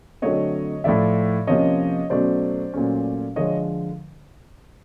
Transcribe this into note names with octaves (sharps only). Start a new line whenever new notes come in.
D3 F#3 A3 C4 C#5 D#5
A2 F3 A3 D5 E5
C3 F3 A#3 C#4 C#5 D#5
B2 F#3 A3 C#4 C5 D5
A#2 F#3 A3 C#4
D3 F3 G#3 C#5 D#5